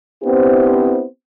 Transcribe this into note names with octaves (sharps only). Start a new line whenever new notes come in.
B3 C4 D4 E4 G4 C5